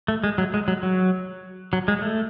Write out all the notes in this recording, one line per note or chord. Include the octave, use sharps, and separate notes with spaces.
A3
G#3
F#3
G#3
F#3
F#3
F#3
G#3
A3